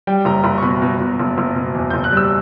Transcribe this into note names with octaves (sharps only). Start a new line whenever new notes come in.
G3 G5
F#1 A#5
F#1 B5
C#6
B2 B5
B2
B2
F#1
F#1
B2
E2
F#1 G6
F#6
G3 E6